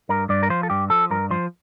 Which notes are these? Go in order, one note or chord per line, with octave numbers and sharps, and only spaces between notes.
G2 A#4
G2 D5
A#4
F3 C5
A4
G2 G4
F3 A4
G2 A#4
F3 C5